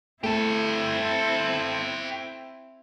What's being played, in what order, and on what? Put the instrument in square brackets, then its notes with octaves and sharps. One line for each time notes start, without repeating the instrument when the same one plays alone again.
[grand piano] A3 [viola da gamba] C4 E4 [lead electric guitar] G4 A4